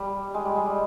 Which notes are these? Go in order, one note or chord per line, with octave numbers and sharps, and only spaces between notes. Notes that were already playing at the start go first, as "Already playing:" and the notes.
Already playing: G3
G#3
G3
G#3
G3